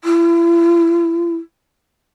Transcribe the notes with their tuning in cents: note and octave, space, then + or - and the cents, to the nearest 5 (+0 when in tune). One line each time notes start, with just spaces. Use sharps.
E4 +40